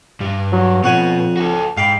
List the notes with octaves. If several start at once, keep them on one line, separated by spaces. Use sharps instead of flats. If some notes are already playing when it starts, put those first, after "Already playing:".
G2 G3
F#3
F2 B2 C#5 F#5 G#5
F#4 A4
G#2 F5 G5 B5